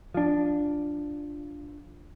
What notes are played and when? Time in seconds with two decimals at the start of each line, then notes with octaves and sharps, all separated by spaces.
0.14 F3 D4